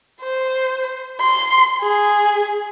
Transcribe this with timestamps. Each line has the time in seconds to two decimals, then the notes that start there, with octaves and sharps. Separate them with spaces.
0.22 C5
1.21 C6
1.82 G#4